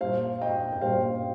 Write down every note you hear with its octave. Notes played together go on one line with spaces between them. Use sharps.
A#2 G3 C5 F5
D#5 G5
G5
A#2 G3 C5 F5